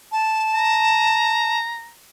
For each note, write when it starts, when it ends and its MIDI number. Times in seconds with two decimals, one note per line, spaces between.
0.12 1.59 81
0.54 1.90 82